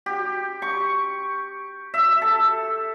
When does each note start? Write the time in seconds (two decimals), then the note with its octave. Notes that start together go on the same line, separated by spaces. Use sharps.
0.06 G4
0.62 C#6
1.94 E5
2.22 A4